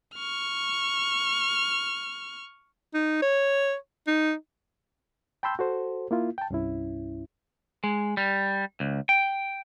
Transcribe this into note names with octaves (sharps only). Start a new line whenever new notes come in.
C#6 F6
D#4
C#5
D#4
G5 A5 B5 C6 E6 G6
F#4 A4 C5
A#3 E4 F4
G5 A5
C2 G2 C#4 E4
G#3
G3
C#2
G5